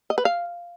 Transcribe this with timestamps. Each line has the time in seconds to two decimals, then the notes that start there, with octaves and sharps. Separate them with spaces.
0.10 D#5
0.18 B4
0.25 F5